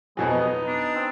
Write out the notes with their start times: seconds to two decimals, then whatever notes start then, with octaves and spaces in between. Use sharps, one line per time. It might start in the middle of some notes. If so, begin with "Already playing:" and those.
0.17 F2 B2 F#3 G#3 D#5 G#5
0.30 B3 D#4
0.67 D4
0.95 C4